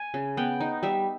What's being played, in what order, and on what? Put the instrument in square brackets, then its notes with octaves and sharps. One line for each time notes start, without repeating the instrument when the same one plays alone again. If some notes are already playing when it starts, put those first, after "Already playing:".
Already playing: [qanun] G#5
C#3
B3 G5
D#4
G3 E5